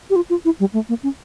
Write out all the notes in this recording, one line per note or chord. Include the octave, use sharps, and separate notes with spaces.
G4
F4
F4
E4
G3
A3
A#3
C#4